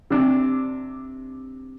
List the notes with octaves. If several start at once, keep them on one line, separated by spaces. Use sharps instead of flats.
C3 D4